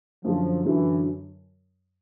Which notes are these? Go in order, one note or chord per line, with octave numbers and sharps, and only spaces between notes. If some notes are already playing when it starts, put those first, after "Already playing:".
F#2 D3 F3 F#3
F#2 D3 E3 F#3